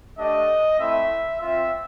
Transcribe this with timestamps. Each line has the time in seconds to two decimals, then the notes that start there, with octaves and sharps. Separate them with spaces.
0.18 A3 D4 G4 D#5
0.79 A3 C4 E4 E5
1.41 C4 F4 E5